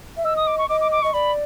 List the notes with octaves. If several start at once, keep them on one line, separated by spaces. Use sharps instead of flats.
E5
D#5 E6
D#6
D6
C#6
D#5 D6
D6
D6
D#5 C#6
D5 B5